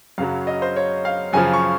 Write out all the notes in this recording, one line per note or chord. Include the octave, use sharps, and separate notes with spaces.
F#2 C#3 F#3 F5
D#5
C5
C#5
F5
F#2 C#3 F3 G#5
C#6